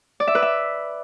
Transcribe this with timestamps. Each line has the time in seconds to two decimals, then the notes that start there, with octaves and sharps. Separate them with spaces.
0.20 D5
0.27 E5
0.35 B4
0.42 E5